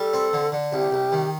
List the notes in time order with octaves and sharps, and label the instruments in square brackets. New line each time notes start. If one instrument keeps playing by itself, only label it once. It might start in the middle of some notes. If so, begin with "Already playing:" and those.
Already playing: [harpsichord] G3 [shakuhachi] A4
[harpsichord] C4
D3
D3
[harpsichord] C2 [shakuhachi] G4
[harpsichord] C2
D#3